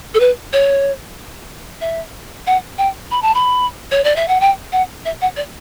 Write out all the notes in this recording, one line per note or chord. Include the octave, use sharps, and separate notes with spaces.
A4
B4
C#5
E5
F#5
G5
B5
A5
B5
C#5
D5
E5
F#5
G5
F#5
E5
F#5
D5